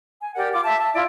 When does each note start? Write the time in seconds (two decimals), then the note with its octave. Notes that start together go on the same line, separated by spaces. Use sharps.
0.22 G#5
0.36 G4 A#4 D5 F#5
0.53 F4 D6
0.65 E5 A5
0.80 A5
0.95 E4 F4 D5 E5